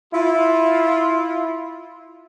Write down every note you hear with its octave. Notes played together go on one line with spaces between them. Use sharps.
E4 F4